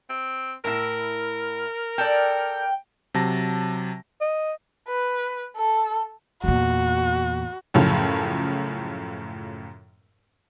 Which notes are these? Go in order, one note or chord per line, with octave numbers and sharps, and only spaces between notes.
C4
A2 E4 A#4
A4 D5 G5
C3 F#3 A5 A#6
D#5
B4
A4
E2 A#2 F#4
F#2 A2 C#3 F3 C#4